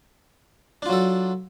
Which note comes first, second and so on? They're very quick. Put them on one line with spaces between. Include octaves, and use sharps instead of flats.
D4 F4 F#3 A4